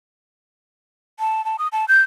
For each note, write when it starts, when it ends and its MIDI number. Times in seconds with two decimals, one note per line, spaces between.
1.20 1.44 81
1.45 1.56 81
1.59 1.68 87
1.72 1.85 81
1.88 2.01 91